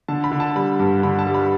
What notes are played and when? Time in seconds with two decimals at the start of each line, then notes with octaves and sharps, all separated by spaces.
0.08 D3 A5
0.24 B5
0.32 D3
0.40 A5
0.56 G3 B5
0.79 G2
1.03 D3 B5
1.19 A5
1.27 G3
1.34 B5